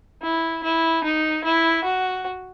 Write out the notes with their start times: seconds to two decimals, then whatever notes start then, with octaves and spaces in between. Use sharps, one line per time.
0.22 E4
0.63 E4
1.04 D#4
1.44 E4
1.84 F#4